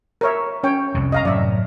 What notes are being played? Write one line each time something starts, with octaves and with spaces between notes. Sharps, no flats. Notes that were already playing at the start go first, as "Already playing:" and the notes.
A#4 C#5 E5
C#4 C#5 G5
C2 F2 C3
D#5 F5 A#5
F#2 A2 C3 D5 E5